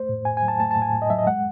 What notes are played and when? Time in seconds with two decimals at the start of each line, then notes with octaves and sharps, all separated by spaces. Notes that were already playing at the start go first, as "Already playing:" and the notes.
Already playing: A3 C5
0.09 A2
0.25 A2 G#5
0.37 G#5
0.43 F#3
0.48 A5
0.60 A3 A5
0.71 A5
0.76 A2
0.82 G#5
0.93 A2
1.02 D#5
1.10 F#3 E5
1.18 D#5
1.27 G#3 F#5